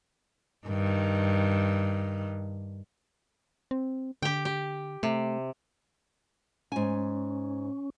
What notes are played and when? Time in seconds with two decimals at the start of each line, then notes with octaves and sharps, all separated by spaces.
0.67 G2 D#3
3.71 C4
4.22 D3 G4 G5
4.45 G4
5.03 C3 A3
6.72 G#2 C#4 G#5